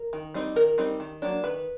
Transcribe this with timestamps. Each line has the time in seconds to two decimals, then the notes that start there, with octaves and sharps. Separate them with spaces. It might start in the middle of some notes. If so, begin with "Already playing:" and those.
Already playing: A#4
0.13 D#3
0.34 G3 C4 D#4
0.56 D#3 A#4
0.78 G3 C4 D#4
1.00 D#3
1.22 F#3 A#3 D4
1.44 D#3 B4